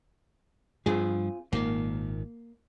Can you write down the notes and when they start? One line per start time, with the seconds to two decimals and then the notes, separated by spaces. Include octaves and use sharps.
0.86 G2 F3 C4 F4 G#4
1.53 G#1 A#2 D#3 A#3